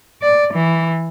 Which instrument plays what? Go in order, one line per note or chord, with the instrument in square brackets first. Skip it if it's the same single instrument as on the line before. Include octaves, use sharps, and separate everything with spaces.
[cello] D5
E3